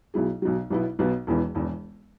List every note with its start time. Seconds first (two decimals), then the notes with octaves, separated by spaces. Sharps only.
0.14 B1 B2 F#3 E4 G#4
0.42 B1 B2 F#3
0.70 B1 B2 B3 E4
0.99 B1 B2 B3
1.27 E1 E2 E3 B3
1.55 E1 E2 E3